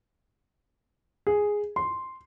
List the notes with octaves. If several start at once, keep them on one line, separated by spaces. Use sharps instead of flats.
G#4
C6